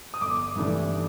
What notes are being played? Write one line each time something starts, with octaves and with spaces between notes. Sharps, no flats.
D#6
G1 D6
G2 E3 A3 D4